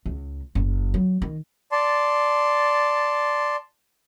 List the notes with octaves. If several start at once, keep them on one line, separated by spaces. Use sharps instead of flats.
C#2
F#1
F#3
D#3
D5 A5 C6